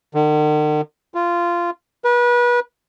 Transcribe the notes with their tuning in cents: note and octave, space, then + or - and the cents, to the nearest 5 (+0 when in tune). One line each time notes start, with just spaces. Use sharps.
D#3 -45
F4 -15
B4 -30